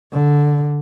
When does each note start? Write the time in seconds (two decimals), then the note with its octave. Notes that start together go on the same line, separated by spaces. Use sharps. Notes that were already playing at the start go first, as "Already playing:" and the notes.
0.13 D3